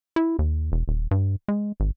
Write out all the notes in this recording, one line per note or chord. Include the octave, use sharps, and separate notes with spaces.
E4
D#2
E1
D#1
G2
G#3
G#1